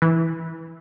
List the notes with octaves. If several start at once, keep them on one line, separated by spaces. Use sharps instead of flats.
E3